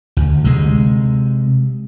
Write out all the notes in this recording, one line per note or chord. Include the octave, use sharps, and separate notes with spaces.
D2
C3 G#3